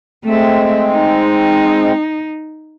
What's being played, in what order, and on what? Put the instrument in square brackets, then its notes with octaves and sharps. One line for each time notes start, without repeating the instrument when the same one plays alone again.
[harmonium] G#3 C4 [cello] A3 E5
[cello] D#4